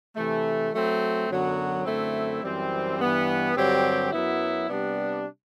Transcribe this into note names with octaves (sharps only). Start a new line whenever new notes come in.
C3 E3 A3
F#3 A3 C4
F#2 D3 F#3 B3
F#2 D3 A3 C4 E4
F#2 E3 G3 C4
G2 E3 B3
G2 D3 F#3 C4 G4
F#2 F#3 B3 E4
C3 G3 B3 D4